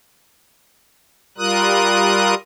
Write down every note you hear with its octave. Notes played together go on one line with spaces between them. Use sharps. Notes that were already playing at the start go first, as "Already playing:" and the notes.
G3 F4 A#4 D#6 F#6